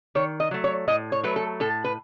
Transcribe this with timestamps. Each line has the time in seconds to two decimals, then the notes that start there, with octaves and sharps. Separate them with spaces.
0.15 D#3 C#5
0.40 D#5
0.51 F#3 A3
0.64 C#5
0.88 A2 D#5
1.12 C#5
1.23 F#3 A3 B4
1.36 A4
1.60 A2 A4
1.84 B4